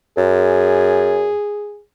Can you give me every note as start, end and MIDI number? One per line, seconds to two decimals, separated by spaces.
0.18 1.32 42
0.18 1.81 68